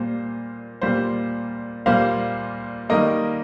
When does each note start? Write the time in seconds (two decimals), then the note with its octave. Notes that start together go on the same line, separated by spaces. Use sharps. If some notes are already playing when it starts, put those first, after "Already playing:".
Already playing: A#2 G3 A#3 C5
0.81 A#2 G3 A#3 C5
1.86 A#2 G3 A#3 C5 F5
2.89 D#3 G3 A#3 A#4 D#5